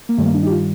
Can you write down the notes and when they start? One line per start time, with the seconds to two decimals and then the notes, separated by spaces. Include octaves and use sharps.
0.09 A#3
0.18 G2 D#3 G3 A3
0.26 A#3
0.34 D4
0.43 D#4
0.47 G4
0.51 F4